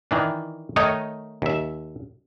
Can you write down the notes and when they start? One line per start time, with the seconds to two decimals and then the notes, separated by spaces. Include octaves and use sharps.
0.11 D#3 E3 D4
0.76 D#3 A3 D#4 C#5 D#5
1.42 D#2 E5